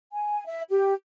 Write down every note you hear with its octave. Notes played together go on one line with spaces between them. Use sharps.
G#5
E5
G4